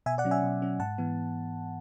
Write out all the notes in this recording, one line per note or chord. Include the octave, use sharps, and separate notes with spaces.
B2 E5 G#5
D5 F#5
F#3 C#4
E5 G#5
B2
F#3 C#4
G#2 F#5 A5
E3 B3